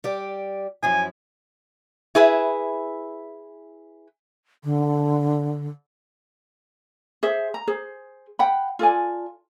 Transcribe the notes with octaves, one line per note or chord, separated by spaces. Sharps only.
G3 G4 D5
F#2 F3 E4 G#5
E4 G#4 B4 E5
D3
G#4 C5 E5
A#5
G#4 C5
F#5 G5 B5
F4 A4 D5 G#5